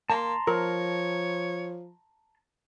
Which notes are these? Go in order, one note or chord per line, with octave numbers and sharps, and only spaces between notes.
A#3 A5 A#5 C6
F3 A#4 C#5